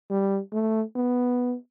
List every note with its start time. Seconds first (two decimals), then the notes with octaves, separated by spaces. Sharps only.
0.10 G3
0.52 A3
0.96 B3